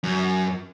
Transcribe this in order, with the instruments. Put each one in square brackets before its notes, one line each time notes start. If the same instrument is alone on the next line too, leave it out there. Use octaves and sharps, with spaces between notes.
[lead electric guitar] F#2